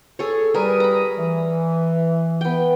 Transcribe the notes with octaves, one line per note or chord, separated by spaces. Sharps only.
G#4 A4 C#5
G3 A#4 B4 G#5 D#6
A#5 B5
E3
B3 G5